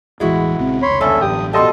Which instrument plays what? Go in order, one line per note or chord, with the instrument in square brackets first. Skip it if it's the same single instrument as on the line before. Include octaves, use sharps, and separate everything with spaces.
[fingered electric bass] E1 A1 E3 [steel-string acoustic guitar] G#3 E4 F#4
[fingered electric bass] A#1 C#3 C4
[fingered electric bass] F1 C#2 [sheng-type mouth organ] C#5 B5 C6
[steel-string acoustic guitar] E2 G2 D3 [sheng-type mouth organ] C#4 A4 E5
[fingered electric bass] A1 F#2 [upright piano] G4 [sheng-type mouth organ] D#6
[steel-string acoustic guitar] B2 G3 [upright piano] G4 D#5 C6 [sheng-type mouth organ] A4 A5